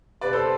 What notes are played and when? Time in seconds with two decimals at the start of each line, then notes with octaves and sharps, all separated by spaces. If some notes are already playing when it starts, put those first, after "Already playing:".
0.21 F1 B4 D5
0.33 A4 C5